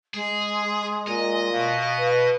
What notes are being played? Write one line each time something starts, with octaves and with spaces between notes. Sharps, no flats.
G#3 G#4
A#2 D#5
B2 F5
B4